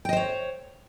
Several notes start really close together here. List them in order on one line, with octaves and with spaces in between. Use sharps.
G5 D#5 C5 C#5